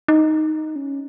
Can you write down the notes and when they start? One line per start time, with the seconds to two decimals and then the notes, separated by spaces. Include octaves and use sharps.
0.08 D#4
0.76 C#4